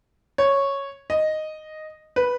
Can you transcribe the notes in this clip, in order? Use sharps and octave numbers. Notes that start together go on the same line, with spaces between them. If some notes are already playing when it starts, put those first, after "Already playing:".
C#5
D#5
B4